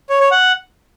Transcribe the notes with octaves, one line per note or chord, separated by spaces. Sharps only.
C#5
C#5
F#5